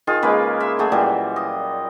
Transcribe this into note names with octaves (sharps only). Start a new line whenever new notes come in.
D#3 F4 G#4
C#3 G#3 A#3 B4
E5
F#3 A3 G#4
A#2 E3 F#3 G3
D#5